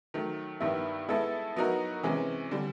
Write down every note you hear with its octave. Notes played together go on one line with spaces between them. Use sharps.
D#3 F#3 A3
G2 D#3 G3 B3 E4
G#3 B3 E4 A4
F#3 B3 D#4 F#4 A#4
C3 E3 G#3 C#4
D3 G3